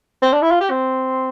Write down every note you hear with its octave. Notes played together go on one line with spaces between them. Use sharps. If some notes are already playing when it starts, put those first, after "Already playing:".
C4
D4
E4
F4
G4
C4